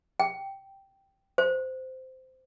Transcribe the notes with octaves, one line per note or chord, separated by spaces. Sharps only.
G5
C5